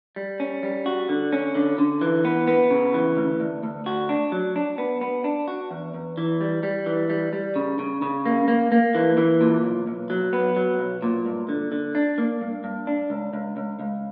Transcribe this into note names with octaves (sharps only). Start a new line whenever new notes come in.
G3
C#4
G3
F#4
D3
C#4
D3
D3
E3
B3
B3
C#3
E3
D2
D2
D2
F#4
D4
F#3
D4
B3
B3
D4
F#4
E2
E2
E3
G3
G3
E3
G3
G3
C#3
C#3
C#3
A#3
A#3
A#3
E3
E3
A#2
B1
B1
F#3
B3
F#3
B1
A#2
G2
D3
D3
D4
A#3
G2
G2
D4
C#2
C#2
C#2
C#2